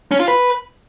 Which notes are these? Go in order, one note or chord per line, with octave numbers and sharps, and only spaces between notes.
C#4
F4
B4